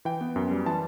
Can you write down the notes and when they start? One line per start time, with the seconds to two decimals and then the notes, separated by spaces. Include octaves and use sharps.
0.05 E3 G5
0.21 B3
0.36 F#2
0.51 G3
0.66 E3 A5